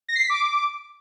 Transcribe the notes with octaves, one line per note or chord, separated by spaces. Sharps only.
A#6
C7
B6
D6